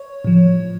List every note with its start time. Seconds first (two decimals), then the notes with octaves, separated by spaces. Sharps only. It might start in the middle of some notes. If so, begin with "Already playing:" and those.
Already playing: C#5
0.25 A2 F3